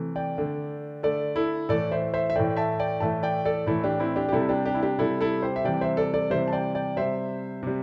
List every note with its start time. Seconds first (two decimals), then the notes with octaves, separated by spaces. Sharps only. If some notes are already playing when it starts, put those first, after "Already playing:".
Already playing: C3 E3 A3
0.16 D5 G5
0.38 D3 A3
1.03 D3 A3 A4 D5
1.36 E4 A4
1.69 A2 E3 A3 A4 D5
1.91 C5 E5
2.14 C5 E5
2.30 E5
2.36 A2 E3 A3 D5 G5
2.57 E5 A5
2.79 D5 G5
3.00 A2 E3 A3 E5 A5
3.23 D5 G5
3.45 A4 D5
3.66 A2 E3 A3 E4 A4
3.84 D4 G4
4.00 C4 E4
4.16 D4 G4
4.29 G4
4.32 C3 G3 E4 A4
4.49 D4 G4
4.65 D4 G4
4.74 E4
4.82 D4 G4
4.98 C3 G3 E4 A4
5.21 E4 A4
5.42 G4 C5
5.56 E5
5.64 C3 E3 G3 D5 G5
5.81 C5 E5
5.97 A4 D5
6.14 A4 D5
6.30 C3 E3 G3 C5 E5
6.48 A5
6.53 D5 G5
6.75 D5 G5
6.96 C3 G3 C5 E5
7.63 C3 G3